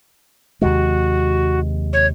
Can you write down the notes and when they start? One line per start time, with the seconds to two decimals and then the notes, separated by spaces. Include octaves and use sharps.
0.62 D#2 C3 G#3 F#4
1.93 C#5